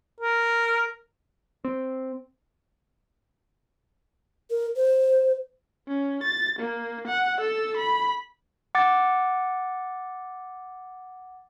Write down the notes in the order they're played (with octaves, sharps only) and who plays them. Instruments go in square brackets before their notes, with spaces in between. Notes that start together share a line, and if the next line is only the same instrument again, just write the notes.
[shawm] A#4
[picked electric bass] C4
[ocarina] A#4
C5
[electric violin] C#4
A6
A#3
F#5
A4 E6
B5
[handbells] F#5 D6 A6